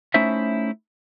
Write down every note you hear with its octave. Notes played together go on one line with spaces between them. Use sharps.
A3 C#4 D#4 E4 C5 E5